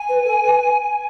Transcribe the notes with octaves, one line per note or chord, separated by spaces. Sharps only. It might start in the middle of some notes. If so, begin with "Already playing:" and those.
Already playing: G#5
B4
A4
B4